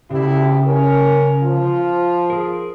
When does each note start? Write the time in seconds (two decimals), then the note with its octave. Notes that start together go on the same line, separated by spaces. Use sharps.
0.11 D2 C#3 E4 G4
0.66 C#4 A#4
1.42 F3 F4
2.30 G#4 A#4